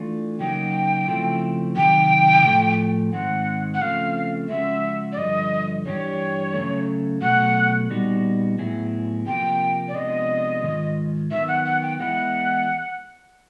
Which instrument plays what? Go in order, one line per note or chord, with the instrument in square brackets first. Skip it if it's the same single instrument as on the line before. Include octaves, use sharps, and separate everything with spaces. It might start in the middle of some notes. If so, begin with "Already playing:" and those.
Already playing: [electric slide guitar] E3 A3 D4 F4
[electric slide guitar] C#3 F#3 A#3 D#4 F#4 [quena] G5
[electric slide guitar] C#3 F3 A3 C4 E4
[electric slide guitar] C3 D#3 F#3 [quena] G5
[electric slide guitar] A2 F3 A3
[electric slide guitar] G#2 D#3 G#3 C4 [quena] F#5
[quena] F#5
[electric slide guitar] C#3 F3 A3 C4 [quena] F5
[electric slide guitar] C#3 F3 G#3 C#4 F#4 [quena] E5
[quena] D5
[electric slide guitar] G2 D3 F3 [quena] D#5
[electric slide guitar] G2 E3 A3 D4 G4 [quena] C#5
[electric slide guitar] C#3 F#3 A3
[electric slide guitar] B2 F#3 A3 [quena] F#5
[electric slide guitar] A#2 G3 B3 D#4 F#4
A2 F#3 B3 E4 G#4
[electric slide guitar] C3 F3 A#3 [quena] G5
[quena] D5
[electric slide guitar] C3 F3 G#3 B3 D4 [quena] D#5
[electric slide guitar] G#2 D#3 G#3 F4
[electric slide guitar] D#3 F#3 B3 [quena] E5
[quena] F#5
F#5
G5
[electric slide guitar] E3 G#3 B3 E4 [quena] F#5